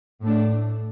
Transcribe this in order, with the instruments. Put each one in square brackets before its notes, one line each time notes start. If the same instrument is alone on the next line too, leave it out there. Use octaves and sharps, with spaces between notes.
[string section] A2 A3 D4